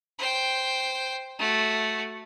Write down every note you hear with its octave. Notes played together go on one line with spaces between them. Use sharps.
C5 G5
A3 F#4